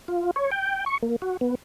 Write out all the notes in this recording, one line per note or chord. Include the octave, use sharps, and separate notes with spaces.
F4
C#5
G5
C#6
A#3
F#4
B3